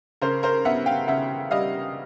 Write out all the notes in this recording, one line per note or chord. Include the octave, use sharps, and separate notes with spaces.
C#3 A#4 C5
A#4 C5
B3 E5 F#5
F5 G5
C#3 E5 F#5
G3 D#5 F5